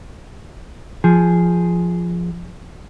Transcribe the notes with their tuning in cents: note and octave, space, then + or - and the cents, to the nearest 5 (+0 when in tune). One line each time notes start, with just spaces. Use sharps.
F3 -5 G#4 +0